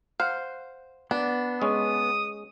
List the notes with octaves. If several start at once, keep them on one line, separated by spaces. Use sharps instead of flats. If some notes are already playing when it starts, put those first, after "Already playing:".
C5 F5 F#5
B3 D4
G#3 C#4 D#6